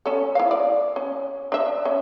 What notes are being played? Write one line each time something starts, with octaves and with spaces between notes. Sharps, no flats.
C#4 A4
E4 F5
D5
C#4
D4 E5
C#4